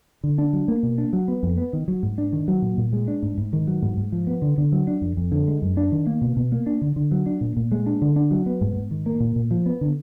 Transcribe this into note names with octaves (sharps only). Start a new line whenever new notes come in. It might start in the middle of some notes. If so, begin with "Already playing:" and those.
D3
D4
F#3
A#3
B2
D4
F#3
B3
F2
B3
D#3
F#3
G#2
D4
D#3
F#3
A#2
A#2
G#3
D4
G#2
G#2
D#3
F#3
G#2
G#2
F3
B3
D3
D3
F#3
D4
F2
F2
D3
G#3
F#2
D4
D#3
A#3
B2
B2
A#3
D4
D3
D3
F#3
D4
A#2
A#2
G#3
D4
D3
D4
F#3
B3
G#2
G#2
D#3
A#3
A#2
A#2
F3
B3
D3